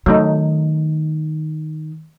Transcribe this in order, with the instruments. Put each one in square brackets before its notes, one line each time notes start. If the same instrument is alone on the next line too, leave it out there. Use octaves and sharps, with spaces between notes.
[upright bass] D#3 [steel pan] F#3 A3 D#4